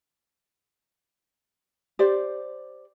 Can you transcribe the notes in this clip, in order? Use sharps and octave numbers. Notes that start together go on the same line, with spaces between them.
G4 C5 D5